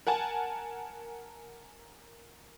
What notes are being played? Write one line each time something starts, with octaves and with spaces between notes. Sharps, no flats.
A#4 F#5 G#5 A5